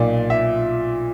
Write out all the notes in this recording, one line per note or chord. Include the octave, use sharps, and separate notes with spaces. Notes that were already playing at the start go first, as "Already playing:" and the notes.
Already playing: B1 A#2 D5
E5